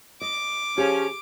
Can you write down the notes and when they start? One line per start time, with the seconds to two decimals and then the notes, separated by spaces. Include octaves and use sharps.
0.21 D#5 D6
0.78 F3 C#4 G4 G#4